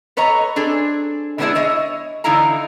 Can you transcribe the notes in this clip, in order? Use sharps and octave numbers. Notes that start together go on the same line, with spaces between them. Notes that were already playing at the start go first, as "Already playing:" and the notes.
A4 B4 C#5 D#5 A#5
C4 D4 G#4 A4
D3 G#3 B3 D4 E4 G#4
C#5 D#5 E5
D3 E3 D#4 E4 F5 A#5